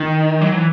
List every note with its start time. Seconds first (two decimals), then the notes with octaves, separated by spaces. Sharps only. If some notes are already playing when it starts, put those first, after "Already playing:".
Already playing: D#3
0.41 F#3
0.54 E3